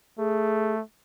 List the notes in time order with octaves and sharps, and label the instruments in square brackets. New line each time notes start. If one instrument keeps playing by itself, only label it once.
[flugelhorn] A3 [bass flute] G#4